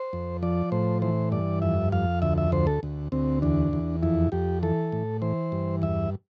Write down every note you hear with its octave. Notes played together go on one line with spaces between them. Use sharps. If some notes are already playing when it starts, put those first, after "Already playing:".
Already playing: C5
F2
F3 D5
A2 C5
E3 C5
G2 D5
F2 E5
F2 F5
D2 E5
E5
D2 C5
A4
D2
D2 C4
E2 D4
E2
F2 E4
F2 G4
E3 A4
A2
E3 C5
G2
E2 E5